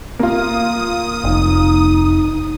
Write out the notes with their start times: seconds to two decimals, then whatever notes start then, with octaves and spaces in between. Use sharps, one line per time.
0.19 A#3 F4 D#6
1.24 F1 D#4